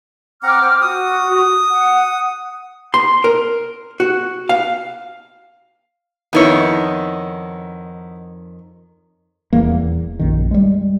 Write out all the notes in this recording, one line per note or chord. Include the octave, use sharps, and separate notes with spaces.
C4 F#5 A#5 D6 F6
C5 G5
F#4 D#6
F#5
C6
A#4
F#4
F5
F2 D#3 B3 D#4 E4 C#5
D#1 E2 A#3
A#1 F#2 D#3
G3 G#3